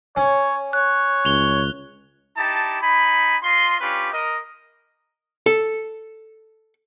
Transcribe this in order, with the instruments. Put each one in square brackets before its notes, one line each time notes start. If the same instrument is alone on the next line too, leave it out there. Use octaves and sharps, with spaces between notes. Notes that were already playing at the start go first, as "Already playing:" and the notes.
[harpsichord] C#4 [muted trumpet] C#5
[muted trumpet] C#5 [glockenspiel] F#6
[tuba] C#2 [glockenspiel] F7 G7
[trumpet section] D#4 E4 G4 A5
D#4 G#5 B5
F4 D#5 C6
C#4 D4 F4 G4 B4
A#4 D#5
[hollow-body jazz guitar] A4